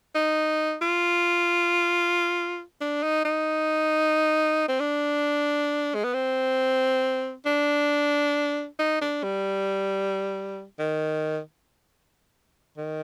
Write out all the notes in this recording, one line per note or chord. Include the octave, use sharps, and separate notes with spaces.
D#4
F4
D4
D#4
D#4
C4
D4
G#3
B3
C4
D4
D#4
D4
G3
D#3
D#3